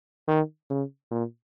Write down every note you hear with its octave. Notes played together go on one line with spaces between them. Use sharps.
D#3
C#3
A#2